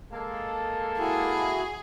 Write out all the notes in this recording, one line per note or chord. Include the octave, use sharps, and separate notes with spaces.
G#3 A#3 A4
E4 F#4 G#4